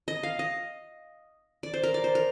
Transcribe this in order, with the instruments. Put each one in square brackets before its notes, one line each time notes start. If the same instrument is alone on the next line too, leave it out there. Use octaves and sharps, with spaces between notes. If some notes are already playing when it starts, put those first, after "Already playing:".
[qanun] D#5
F5
D#5
D5
C5
A#4
D5
C5
A#4